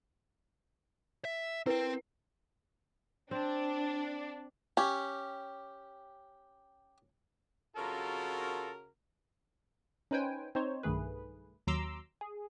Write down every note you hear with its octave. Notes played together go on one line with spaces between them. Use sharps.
E5
C4 E4 A#4 B4 G5
C4 D4
C#4 G4
C#3 F4 F#4 A4 A#4
C#4 D#4 B4 C5 G5 G#5
C4 D#4 C5 C#5
B1 G2 D#3 A3 G#4 B4
D#2 F#3 A#5 C6 D6 E6
G#4